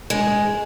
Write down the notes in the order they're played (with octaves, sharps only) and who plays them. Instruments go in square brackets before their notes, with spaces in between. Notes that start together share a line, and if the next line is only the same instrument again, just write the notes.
[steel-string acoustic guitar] G#3